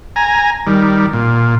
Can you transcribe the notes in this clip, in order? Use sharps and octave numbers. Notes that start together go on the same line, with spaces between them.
G#5 A#5
D#3 G3
A#2